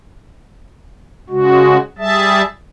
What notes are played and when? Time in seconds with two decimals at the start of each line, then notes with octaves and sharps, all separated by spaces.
1.30 C#3 G#3 F#4
1.99 G3 G#4 E5 A5